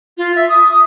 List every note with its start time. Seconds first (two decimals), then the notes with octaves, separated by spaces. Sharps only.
0.18 F4
0.36 E5
0.49 D#6
0.71 D#6